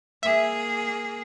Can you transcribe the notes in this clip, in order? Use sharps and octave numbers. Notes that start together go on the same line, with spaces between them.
A#3 G#4 E5